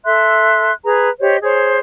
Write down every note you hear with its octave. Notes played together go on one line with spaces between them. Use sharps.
A4 E5 C6 F#6
G#4 B4 A#5
G4 C5 C#5 D#5
G#4 C5 C#5